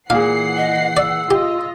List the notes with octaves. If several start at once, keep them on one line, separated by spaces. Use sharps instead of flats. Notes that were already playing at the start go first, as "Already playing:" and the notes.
A#2 E3 G#4 F5 F#5 C7
D#5
D5 E6
F4 G4 D#5